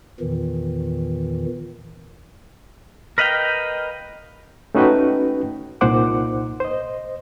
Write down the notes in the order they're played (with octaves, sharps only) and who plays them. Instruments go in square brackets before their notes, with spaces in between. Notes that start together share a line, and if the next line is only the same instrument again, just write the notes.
[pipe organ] E2 A#2 D#3 E3
[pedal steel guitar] A#4 B4 D#5 F5 G5
[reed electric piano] A3 C#4 D#4 F#4 B4 G5
C2 A#2 D#4 C5 F#5 D6
C5 D#5